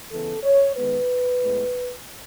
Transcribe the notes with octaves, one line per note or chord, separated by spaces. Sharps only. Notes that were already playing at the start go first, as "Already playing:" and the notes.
C#3 E3 B3 A4
C#5
D#3 G#3 B3 B4
A2 G#3 B3